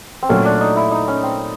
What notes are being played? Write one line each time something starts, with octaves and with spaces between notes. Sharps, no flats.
C4
A#2 F#3 A3 C#4
D4
D#4
E4
D#4
C#4
C4